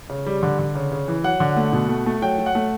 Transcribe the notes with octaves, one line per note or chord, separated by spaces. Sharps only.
C#3
G3
D3
D3
C#3
C#3
E3
F#3 F#5
D3
A3
B2
A3
A3
F#3 G5
F#3
F#5
A3